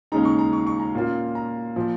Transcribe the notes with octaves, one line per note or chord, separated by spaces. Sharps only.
D#2 C#3 G#3 D#4 A#5
C#6
A#5
C#6
C#6
A#5
A#2 A#3 C#4 F4
A#5
A#2 F3